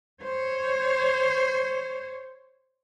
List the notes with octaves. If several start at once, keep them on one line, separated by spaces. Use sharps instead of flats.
C5 C#5